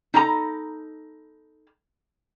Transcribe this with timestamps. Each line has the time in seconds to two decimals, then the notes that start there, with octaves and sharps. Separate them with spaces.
0.14 D#4 A4 A#5